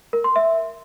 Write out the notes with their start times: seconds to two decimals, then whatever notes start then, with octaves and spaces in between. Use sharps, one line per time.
0.13 A#4
0.24 C6
0.36 E5